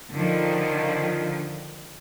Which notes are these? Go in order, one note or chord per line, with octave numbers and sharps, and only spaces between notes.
D3 D#3 F3